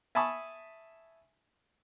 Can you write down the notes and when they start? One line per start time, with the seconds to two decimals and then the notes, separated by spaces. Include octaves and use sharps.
0.15 E5 G#5 A5 B5 C#6 D#6